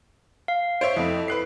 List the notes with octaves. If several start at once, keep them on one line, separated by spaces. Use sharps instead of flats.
F5
C5 C#5 E5 D7
F2 E4 A4
B4 F#6 C7